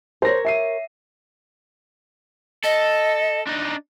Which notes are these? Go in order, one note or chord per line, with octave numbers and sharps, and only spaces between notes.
A#4 C5 C#5 A#6
E5 C7 D#7
A4 D#5
D4 D#4